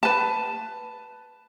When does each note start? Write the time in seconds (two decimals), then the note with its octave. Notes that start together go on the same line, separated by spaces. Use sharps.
0.03 B4 A5